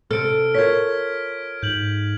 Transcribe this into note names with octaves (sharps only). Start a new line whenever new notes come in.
C3 A4 F6 D7
F4 A#4 C#5 G#6 B6
G#2 G6 F#7